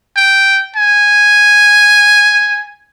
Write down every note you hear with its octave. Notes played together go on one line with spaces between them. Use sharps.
G5
G#5